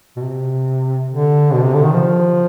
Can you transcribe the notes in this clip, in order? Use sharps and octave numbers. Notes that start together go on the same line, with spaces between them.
B2
C3
D3
B2
C3
D3
D#3
F3